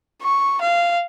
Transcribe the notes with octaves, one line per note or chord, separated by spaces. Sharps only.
C#6
F5